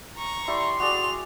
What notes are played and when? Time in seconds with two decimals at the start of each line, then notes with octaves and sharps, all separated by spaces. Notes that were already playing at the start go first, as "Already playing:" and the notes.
0.17 A#5 C#6
0.48 E4 G4 D5 C6
0.80 F#4 G#4 D5 F7